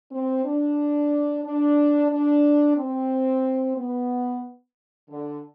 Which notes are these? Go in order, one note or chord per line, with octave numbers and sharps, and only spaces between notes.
C4
D4
D4
D4
C4
B3
D3